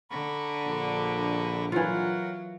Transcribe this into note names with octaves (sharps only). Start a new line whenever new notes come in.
D3 A#5 B5 C#6
A#1
E3 F#3 F4 A#4 F#5